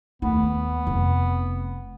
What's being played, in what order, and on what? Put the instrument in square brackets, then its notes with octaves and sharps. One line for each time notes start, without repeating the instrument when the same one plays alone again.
[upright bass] D#2 A3 [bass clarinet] B3
[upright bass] F1